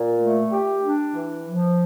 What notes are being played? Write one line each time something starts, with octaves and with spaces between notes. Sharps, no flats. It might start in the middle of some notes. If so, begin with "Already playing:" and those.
Already playing: A#2
A3
G4
D4
E3
F3